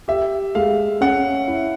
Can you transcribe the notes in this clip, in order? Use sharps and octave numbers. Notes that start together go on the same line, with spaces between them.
G4 E5
G#3 F5
C#4 F#5
E4